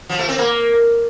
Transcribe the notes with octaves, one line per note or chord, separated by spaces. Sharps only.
F3
A3
C4
A#3